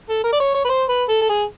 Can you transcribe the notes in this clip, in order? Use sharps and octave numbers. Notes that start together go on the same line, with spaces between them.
A4
A#4
D5
C#5
C#5
B4
C5
B4
A4
A4
G#4